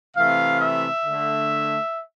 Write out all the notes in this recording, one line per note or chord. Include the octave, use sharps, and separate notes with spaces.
C3 E3 A3 F5
E5
D3 A3